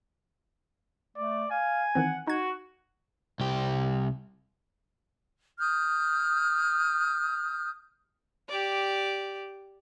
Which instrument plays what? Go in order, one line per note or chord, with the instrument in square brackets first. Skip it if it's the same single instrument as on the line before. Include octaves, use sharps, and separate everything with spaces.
[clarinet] A3 [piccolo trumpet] D5
[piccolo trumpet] F5 [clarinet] G#5
[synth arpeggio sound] D#3 E3 C4 [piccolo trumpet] F#5
[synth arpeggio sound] D#4 G#6 [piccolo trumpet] F#4
[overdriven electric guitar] C2 G4
[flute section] D#6 F6 G6
[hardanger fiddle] G4 D5